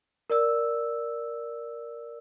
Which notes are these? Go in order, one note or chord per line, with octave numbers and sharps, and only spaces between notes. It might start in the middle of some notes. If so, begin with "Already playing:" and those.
A#4 D5 E6